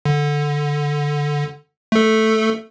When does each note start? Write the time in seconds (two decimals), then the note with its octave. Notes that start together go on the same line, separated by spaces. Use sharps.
0.05 D3
1.92 A3 A4